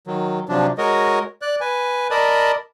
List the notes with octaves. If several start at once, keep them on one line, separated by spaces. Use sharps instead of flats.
D#3 F#3
C3 F3 F#3 D4
G#3 F#4 A#4 C#5 D#5
D5 F#6
B4 G#5
A#4 D5 D#5 A5 B5